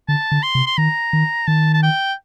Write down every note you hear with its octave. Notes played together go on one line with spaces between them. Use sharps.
D3 A5
D3
C6
C3
C6
D#3 A#5
D#3
D#3 A5
A5
G5